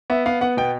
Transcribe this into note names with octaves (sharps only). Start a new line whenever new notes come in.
B3 E5
B3 F5
B3 F#5
B2 G5